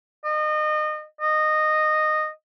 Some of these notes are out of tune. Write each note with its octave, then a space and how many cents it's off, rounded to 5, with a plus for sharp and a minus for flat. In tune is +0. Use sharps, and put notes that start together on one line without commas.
D#5 -30
D#5 -15